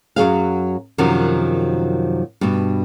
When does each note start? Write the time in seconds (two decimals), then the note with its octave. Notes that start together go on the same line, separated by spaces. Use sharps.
0.16 F#2 F#3 G#4 F5
0.98 F#2 C3 D#3 F3 F#3
2.41 G2 B2